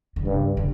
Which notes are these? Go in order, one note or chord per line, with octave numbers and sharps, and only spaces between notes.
D3
G2 C#3
D3